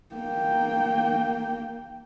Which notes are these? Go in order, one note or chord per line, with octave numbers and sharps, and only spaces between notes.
A#3 G5